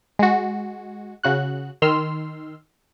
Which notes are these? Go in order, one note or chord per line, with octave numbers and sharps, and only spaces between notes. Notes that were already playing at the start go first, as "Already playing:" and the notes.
G#3 F#4
C#3 F#4 F#6
D#3 C6 E6 F6